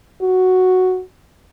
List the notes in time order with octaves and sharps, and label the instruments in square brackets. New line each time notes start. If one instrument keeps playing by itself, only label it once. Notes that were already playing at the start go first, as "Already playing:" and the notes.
[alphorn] F#4